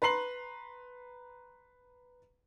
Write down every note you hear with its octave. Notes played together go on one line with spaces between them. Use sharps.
B4 A#5 C6 C7 F#7